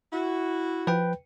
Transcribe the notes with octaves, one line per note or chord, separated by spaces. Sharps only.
E4 F#4
F3 B4 G5